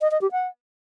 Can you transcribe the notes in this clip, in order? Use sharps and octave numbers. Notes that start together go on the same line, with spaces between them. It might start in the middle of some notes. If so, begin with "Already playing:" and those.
D#5
D#5
G4
F#5